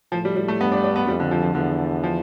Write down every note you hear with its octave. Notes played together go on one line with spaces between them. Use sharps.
A2 F3
G3
G3
A3
G2 B3
D4
D4
B3
F2 G3
D3
F3
F3
E2 D3
F3